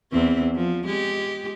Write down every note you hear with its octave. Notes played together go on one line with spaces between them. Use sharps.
E2 C4
F3
G#3 G4